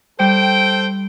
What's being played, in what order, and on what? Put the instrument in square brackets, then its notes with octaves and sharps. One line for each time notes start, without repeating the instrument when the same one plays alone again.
[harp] G3 [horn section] A4 C5 G5